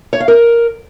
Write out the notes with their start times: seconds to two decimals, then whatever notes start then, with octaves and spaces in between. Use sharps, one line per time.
0.13 C#5
0.20 F5
0.28 A#4